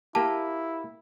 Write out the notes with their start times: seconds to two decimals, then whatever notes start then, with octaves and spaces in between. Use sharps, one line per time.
0.15 A#3 E4 G4 A5